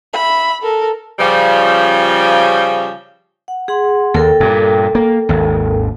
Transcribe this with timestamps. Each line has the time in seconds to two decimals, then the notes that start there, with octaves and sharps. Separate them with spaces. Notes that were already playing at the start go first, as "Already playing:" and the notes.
0.13 E5 B5
0.62 A4 A#4
1.19 C#3 F3 G3
3.48 F#5
3.68 G#4 F#5 C6
4.14 D#2 A4 A#4 G5
4.40 G2 A#2
4.95 A#3
5.29 G#1 D#2